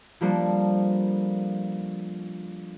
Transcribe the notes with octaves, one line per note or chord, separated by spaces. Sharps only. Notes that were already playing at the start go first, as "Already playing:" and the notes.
F3 G3 A#3 D4 A4 C5